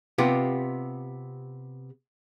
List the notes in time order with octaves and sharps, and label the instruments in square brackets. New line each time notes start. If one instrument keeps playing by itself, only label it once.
[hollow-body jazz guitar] C3 B3 F4 G4